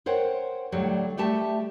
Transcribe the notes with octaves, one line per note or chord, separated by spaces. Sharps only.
A#4 C5 C#5 F#5 G5
A2 D3 F#3 G3
G3 A3 G4 E5 A5